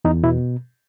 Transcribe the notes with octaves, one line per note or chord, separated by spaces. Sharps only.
E2 D#4
B2 E4